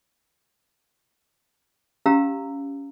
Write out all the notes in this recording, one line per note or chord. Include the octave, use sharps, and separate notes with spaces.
C#4 G4 F5 A#5 E6